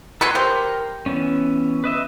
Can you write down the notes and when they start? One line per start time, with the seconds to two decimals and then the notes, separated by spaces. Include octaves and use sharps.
0.21 B3 F#4 A4 B4 G#5 C6
0.35 G4 A#4 C5
1.06 E3 B3 C#4
1.84 B4 D#5 E5